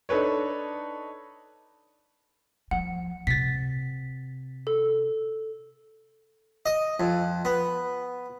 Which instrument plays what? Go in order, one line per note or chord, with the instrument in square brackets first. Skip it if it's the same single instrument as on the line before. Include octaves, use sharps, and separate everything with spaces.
[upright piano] D4 D#4 A4 B4 C#5
[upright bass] F3 [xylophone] F#5
[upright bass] C3 [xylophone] A6 B6
[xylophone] A4
[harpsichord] D#5
F2
B3